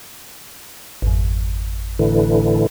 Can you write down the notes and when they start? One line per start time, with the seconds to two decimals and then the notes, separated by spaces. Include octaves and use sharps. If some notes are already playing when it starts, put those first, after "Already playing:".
1.02 G#1 F2
1.99 A2 D3 E3